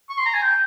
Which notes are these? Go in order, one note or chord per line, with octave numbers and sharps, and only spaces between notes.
C#6
C6
A#5
G#5
G5